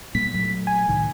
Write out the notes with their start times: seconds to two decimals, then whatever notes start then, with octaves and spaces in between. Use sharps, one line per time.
0.15 B2 G3 A#3 B6
0.33 A#2 F#3 A3
0.67 G#5
0.89 C2 A2 D#3